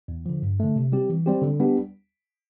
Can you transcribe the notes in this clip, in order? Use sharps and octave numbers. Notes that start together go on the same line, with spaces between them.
E2
D3 F3
G2
D3 A3
C3
G3 C4 G4
E3
G3 C4 G4
D3
G3 B3 D4 G4